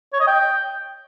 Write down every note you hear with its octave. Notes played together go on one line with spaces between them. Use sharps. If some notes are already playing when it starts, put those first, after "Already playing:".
C#5
D#5
G5